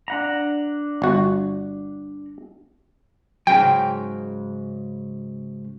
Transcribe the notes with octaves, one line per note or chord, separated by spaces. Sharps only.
D4 F#5 A#5
G1 F#4
G#2 C#3 F#3 G5